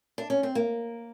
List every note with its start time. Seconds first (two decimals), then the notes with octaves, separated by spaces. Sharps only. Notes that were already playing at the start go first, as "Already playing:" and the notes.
0.18 D4
0.30 C#4
0.43 C4
0.55 A#3